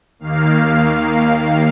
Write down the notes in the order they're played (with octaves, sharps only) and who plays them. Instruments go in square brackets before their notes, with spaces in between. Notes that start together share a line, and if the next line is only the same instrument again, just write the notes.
[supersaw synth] D#2 D#3 A#3 F5